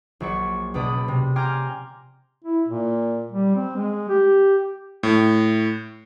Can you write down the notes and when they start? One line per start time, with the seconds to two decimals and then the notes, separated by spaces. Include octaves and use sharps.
0.20 A#1 F#3 D5 C#6
0.74 C#2 B2 D5 B5 D#6
1.08 C3
1.36 G5 G#5 A#5 C6 D6 F6
2.44 E4
2.68 A#2
3.32 G3
3.56 C4
3.76 G#3
4.09 G4
5.03 A2